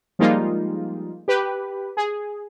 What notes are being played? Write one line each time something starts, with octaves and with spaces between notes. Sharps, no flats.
F3 G3 G#3 A#3 D#4 F4
G4 B4
G#4